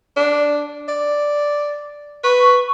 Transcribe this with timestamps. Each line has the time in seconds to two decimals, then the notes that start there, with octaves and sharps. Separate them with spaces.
0.17 D4
0.88 D5
2.24 B4 C#6